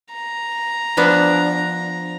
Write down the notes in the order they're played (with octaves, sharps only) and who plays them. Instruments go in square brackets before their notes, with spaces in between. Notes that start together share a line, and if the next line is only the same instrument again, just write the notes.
[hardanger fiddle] A#5
[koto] F3 B3 D4